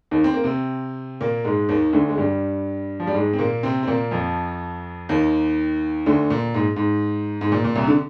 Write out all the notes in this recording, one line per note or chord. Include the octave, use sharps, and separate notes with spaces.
D#2 D#3
C4
A#3
C3 C4
A#2 A#3
G#2 G#3
D#2 D#3
D2 D3
G#3
G2 G3
F3
G3
G#2 G#3
C4
A#2 A#3
C3 C4
C4
A#2 A#3
F2 F3
D#2 D#3
D2 D3
A#2
G#2
G#2
G#2
A#2
A#2
C2 C3
D3